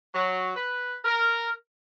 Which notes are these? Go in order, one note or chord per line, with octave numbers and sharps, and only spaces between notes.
F#3
B4
A#4